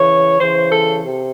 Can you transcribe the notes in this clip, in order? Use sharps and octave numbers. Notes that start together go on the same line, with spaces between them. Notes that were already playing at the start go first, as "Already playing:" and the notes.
Already playing: C#3 E3 C#5
C#3 E3 C5
A4
C3